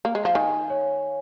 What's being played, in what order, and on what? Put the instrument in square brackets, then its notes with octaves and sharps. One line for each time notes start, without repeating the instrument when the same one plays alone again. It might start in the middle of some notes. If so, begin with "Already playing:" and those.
[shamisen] A#3
G#3
[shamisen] F3 [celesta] F5
[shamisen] D#3 [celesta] G#5
[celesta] C#5